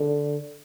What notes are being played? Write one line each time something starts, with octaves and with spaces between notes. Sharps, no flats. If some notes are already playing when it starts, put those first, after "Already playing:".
Already playing: D3